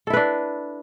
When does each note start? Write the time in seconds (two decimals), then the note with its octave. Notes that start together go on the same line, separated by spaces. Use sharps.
0.07 A4
0.10 E4
0.13 B4
0.17 D4